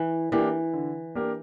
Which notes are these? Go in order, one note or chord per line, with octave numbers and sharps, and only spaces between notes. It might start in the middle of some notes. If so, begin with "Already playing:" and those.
Already playing: E3
E3 A#3 D4 G4 A#4
D3
A#3 D4 G4 A#4